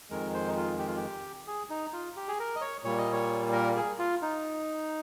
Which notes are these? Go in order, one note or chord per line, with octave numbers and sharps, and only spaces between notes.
F2 D#3 G#3 A#4
C5
D#4
F4
G4
F4
G4
G#4
D#4
F4
G4
G#4
A#4
D#5
C#5
A#2 G3 A#3 C#5
D#5
C#5
A#4
G#4
F4
D#4